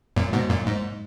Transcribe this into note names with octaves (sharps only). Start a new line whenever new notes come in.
F#2 A#2
G#2 B2
F#2 A#2
G#2